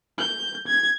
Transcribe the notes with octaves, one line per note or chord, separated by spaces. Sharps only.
G6
G#6